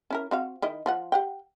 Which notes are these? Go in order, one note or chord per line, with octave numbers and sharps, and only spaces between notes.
C#4 E4 A#4
C4 F#4 F5
D#3 E4 D#5
F3 F4 F#5
G4 F#5 G5